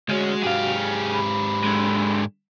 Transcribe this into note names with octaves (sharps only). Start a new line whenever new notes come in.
D2 G#3 C#4 F#4
G#2 G4 G#4 F5
B5
D3 G#3